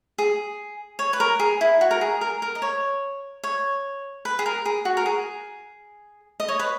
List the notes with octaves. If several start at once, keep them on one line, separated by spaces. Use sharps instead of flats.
G#4
C#5
B4
A#4
G#4
E4
F#4
A#4
G#4
A#4
A#4
D#5
C#5
C#5
B4
G#4
A#4
G#4
F#4
A#4
G#4
D#5
C#5
B4